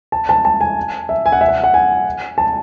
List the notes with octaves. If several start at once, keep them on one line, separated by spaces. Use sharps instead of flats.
A5
A5
A5
G#5
E5
G#5
F#5
E5
F#5
F#5
G#5
A5